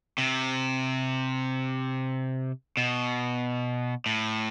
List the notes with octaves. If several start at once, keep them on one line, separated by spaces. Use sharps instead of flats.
C3
B2
A2